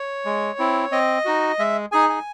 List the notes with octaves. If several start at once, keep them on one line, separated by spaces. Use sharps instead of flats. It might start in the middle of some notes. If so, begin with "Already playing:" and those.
Already playing: C#5
G#3
C4 E4
C4 D#5
D#4 F#4
G#3 E5
D#4 G#4 G#5
G#5